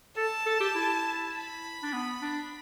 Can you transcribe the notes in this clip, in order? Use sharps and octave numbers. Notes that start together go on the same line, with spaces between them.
A4 A5
A4
G4
E4
B5
D4
B3
D4